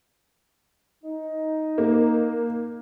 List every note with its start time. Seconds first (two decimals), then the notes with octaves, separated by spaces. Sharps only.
1.03 D#4
1.78 A#3